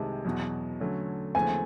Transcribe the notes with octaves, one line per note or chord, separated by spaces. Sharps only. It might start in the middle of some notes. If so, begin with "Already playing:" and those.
Already playing: C2 C3 D#3 G#3 A5
E2 B2 F#3
D3 F#3 A3 C#4
D#2 C#3 F3 A3 C4 G#5